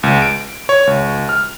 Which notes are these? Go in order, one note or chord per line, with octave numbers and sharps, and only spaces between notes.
C#2
D7
C#5
C#2
F6